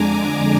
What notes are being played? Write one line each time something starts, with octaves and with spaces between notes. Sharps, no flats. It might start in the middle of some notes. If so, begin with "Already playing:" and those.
Already playing: F2 D3 G#3 D4 G#5 A#5 D6
A#5